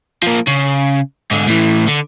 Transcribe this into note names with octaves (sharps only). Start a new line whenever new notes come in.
F3 A#3
C#3
G#2 D3
A2 E3
D3